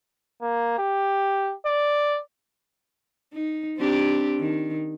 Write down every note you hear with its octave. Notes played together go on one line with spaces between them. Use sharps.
A#3
G4
D5
D#4
C4 D4 G4
D#3